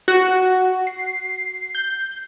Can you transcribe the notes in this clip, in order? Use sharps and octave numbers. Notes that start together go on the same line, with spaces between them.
F#4
C7
G6